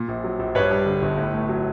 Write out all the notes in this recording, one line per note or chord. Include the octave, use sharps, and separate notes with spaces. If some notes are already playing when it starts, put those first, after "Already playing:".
Already playing: A#2
A#1
F#3
A#1
G2 B4 C#5
G3
D3
G1
A2
A3
F#3